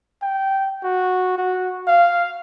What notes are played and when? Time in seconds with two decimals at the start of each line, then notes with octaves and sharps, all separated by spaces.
0.23 G5
0.84 F#4
1.38 F#4
1.88 F5